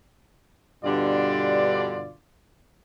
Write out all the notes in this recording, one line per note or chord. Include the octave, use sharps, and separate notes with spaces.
G2 B2 D3 D4 F4 D5